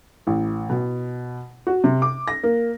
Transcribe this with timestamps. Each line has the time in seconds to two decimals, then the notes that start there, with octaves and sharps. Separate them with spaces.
0.27 A1
0.69 B2
1.67 F#4
1.84 C3
2.02 D6
2.28 A#6
2.43 A#3